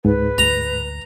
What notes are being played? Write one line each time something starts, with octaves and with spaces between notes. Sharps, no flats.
C#2 G#2 B4
D2 A#5